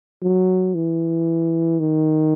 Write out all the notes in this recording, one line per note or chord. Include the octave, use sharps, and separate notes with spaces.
F#3
E3
D#3